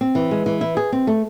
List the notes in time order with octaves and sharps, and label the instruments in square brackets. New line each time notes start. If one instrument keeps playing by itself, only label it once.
[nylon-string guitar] C4
E3
G#3
E3
E4
G#4
C4
A3